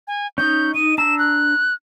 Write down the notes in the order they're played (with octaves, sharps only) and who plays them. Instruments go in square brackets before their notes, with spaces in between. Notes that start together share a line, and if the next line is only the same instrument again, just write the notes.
[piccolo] G#5
[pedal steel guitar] C#4 D#4 [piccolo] G6
[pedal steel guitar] D#4 [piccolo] D#7
[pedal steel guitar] D4 A#5 E6 [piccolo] E7
[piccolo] F#6